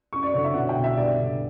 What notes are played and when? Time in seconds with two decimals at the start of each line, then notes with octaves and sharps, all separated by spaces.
0.13 F#2 C#6
0.23 D5
0.34 D3 C#5
0.44 E5
0.54 B2 F#5
0.69 G5
0.76 B1
0.84 E5
0.97 G2 D5
1.19 D3